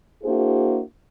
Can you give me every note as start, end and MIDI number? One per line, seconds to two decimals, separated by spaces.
0.23 0.80 58
0.23 0.80 62
0.23 0.80 64
0.23 0.80 66
0.23 0.80 68
0.23 0.80 72